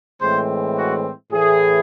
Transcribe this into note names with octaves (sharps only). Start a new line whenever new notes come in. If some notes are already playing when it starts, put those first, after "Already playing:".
A2 E3 G#3 C4 C5
F#4
A2 E3 A3 G#4